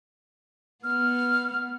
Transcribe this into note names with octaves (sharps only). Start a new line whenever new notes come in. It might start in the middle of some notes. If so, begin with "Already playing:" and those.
B3 F6